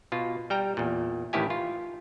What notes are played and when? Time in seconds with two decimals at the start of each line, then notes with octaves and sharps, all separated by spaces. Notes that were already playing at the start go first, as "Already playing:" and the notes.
0.12 B2 F4
0.50 G3 G5 A#5
0.77 E2 A#2
1.33 A1 A2 D#3 E4 G4 G#5
1.50 F4